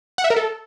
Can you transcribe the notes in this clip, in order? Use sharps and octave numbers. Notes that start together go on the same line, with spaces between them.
F#5
E5
A#4
A4